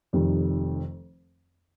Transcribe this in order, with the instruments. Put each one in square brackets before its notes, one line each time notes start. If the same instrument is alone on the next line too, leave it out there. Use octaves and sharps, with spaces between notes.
[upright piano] F1 F2 D#3 G3